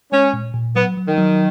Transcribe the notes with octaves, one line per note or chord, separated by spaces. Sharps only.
G#3 C#4
A#2
A#2
F#3 B3
F#3
D#3
F#3